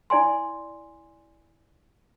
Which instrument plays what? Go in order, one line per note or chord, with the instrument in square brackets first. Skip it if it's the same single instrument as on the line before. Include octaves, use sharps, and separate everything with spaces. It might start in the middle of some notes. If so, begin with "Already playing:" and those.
[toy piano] E4 D5 G#5 C6